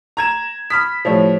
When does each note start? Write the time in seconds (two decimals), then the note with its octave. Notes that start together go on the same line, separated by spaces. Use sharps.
0.17 A#5 G#6 E7
0.70 B5 D#6 F6 B6
1.05 A2 F3 G4 C#5 D5